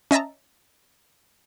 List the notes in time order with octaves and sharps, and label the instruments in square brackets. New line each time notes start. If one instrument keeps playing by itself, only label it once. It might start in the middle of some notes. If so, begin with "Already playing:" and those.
[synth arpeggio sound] C#4 D#5 E5 A5 A#5